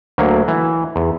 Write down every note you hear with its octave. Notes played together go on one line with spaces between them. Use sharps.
D2 F#3 A#3
E3
E2